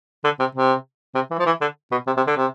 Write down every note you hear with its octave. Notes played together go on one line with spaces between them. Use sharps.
D3
C3
C3
C3
E3
F3
E3
D3
B2
C3
C3
D3
C3